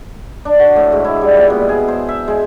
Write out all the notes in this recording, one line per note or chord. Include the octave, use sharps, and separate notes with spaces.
D4
F#4
A2
G#2
E4
G3
A#2
B2
G#4
C5
E5
G#3